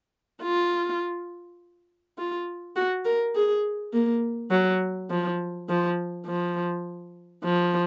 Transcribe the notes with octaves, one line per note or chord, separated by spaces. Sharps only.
F4
F4
F#4
A#4
G#4
A#3
F#3
F3
F3
F3
F3